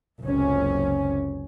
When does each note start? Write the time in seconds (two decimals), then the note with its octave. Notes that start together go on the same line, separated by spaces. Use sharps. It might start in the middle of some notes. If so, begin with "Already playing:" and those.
0.22 F#1 C#2 C3 C#4